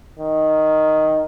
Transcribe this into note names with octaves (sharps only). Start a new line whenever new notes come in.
D#3